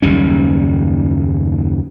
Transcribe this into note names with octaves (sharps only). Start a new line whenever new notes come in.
F#1 D#2 G3 C#4